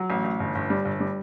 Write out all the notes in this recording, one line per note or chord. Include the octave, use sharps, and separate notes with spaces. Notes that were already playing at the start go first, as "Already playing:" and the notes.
Already playing: F#3
A1
A1
G1
G1
G3
G1
G3